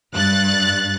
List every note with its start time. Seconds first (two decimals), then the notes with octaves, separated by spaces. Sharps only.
0.14 G2 F#6 A6